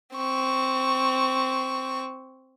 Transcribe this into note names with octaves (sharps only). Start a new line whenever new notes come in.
C4 C#6